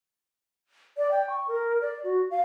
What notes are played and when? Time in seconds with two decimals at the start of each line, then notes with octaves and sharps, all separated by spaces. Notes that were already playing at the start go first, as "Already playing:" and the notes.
0.97 D5
1.11 G5
1.30 C#6
1.48 A#4
1.82 D5
2.04 F#4
2.31 F5